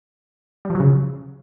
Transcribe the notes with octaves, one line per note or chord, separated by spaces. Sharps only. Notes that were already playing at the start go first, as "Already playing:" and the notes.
G3
F3
F#3
C#3